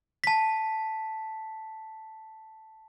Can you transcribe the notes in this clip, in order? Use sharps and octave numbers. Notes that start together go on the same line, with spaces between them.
A5 B6